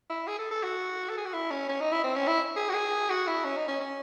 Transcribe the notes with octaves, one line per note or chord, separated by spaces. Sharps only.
E4
G#4
A4
A4
F#4
A4
G#4
F#4
E4
C#4
C#4
D#4
E4
C4
C#4
E4
G#4
F#4
G#4
F#4
E4
C#4
D#4
C#4
C#4